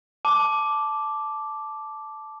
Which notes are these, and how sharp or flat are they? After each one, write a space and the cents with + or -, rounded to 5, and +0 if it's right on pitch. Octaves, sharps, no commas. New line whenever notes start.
A5 -10 D6 +0